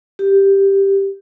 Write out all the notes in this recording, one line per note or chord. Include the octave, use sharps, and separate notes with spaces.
G4